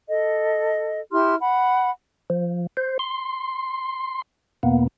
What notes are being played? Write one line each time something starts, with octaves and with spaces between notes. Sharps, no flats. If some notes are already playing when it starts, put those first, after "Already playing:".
A4 D#5
E4 G4 C6 F6
F#5 B5
F3
C5
C6
E2 B2 A#3 B3